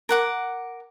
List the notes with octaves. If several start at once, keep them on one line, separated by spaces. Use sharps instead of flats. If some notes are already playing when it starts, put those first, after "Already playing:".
A#4 F#5 D6